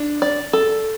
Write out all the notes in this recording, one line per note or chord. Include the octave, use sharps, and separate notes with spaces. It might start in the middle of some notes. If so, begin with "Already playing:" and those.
Already playing: D4
D5
A4